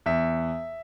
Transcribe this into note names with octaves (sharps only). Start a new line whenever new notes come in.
E2 E5